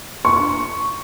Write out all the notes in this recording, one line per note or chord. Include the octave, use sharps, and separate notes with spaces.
C#6